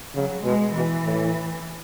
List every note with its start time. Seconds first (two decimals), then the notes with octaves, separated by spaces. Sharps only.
0.15 C#3 F#3
0.45 B2 G#3
0.74 B2 E3
1.05 A2